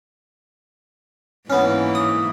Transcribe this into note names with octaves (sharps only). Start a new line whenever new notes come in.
G#2 E3 A#3 B3 C#4
D#6